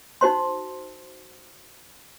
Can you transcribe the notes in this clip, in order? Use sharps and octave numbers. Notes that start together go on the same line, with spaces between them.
D#4 F#4 C5 C6